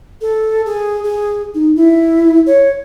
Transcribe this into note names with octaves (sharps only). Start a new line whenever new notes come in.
A4
G#4
G#4
D#4
E4
C#5